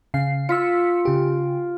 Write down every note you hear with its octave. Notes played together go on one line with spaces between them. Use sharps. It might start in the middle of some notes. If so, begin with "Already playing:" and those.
C#3 F5 C7
F4 E6 B6 C#7
C#3 G4